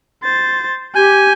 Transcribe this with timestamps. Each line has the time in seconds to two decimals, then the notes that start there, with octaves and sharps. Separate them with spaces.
0.23 C5 A6
0.95 G4 G#5 G6